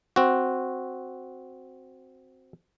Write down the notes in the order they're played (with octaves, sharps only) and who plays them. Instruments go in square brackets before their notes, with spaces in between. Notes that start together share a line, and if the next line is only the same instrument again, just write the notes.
[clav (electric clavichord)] C4 F#4